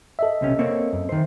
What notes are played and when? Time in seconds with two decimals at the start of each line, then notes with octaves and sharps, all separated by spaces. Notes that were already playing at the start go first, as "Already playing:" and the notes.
0.19 A4 D#5 E5
0.41 B1 C3 C#4
0.59 A#3 C4 C#5
0.93 F#2
1.09 D#3 C5